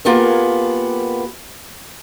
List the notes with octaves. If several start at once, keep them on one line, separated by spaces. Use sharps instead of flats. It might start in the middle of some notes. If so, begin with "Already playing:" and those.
A#3 B3 F4 G4 G#4 A#4